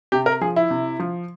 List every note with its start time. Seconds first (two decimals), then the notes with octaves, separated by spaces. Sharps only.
0.12 C3 G4
0.26 A#4
0.41 F3 G#4
0.56 E4
0.70 C3
0.99 F3